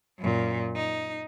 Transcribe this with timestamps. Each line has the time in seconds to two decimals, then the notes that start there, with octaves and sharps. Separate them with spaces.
0.19 F#2 A#2
0.76 D#4